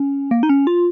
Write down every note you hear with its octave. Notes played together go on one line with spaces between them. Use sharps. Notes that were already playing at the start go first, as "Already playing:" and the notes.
Already playing: C#4
A#3
D#4
C#4
F4